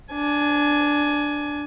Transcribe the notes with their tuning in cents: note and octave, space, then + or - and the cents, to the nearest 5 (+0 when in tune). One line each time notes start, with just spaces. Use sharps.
D4 +0 G#5 +20